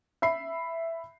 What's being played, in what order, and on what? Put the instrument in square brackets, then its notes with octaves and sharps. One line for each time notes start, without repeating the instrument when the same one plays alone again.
[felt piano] E5 B5 C7